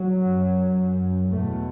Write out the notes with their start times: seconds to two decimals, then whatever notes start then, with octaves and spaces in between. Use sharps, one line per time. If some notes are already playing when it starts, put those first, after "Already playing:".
Already playing: F#3
0.18 F#2
1.32 E2 B2 A3